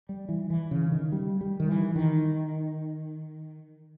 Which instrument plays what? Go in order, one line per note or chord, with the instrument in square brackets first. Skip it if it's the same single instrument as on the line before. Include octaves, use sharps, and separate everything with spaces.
[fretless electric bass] G3
E3
E3
C#3
D#3
G3
G3
D#3
E3
D#3